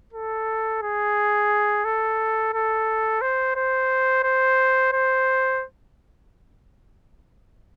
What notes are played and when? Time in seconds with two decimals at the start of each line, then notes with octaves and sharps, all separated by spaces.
0.13 A4
0.82 G#4
1.85 A4
2.54 A4
3.22 C5
3.56 C5
4.24 C5
4.92 C5